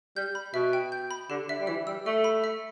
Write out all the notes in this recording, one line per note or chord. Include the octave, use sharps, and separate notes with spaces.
G3 G6
B5
B2 E5
G5
G6
B5
D3 G4
D3 E5
G3
E3 E5
G3 E6
A3 E5
B5
E5